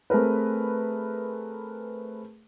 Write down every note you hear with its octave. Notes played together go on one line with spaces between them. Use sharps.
A3 C4 G#4 A#4 B4